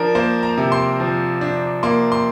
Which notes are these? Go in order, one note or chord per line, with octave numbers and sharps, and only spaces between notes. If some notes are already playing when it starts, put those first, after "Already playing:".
Already playing: F3 D4 A#4
A#3 C5
A#5
C3
C6
F3
D4
A#3 C6
C6